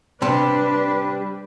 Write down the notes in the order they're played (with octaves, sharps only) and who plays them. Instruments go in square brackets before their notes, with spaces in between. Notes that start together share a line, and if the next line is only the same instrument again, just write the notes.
[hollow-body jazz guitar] C3 G3 A5 [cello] D4 B4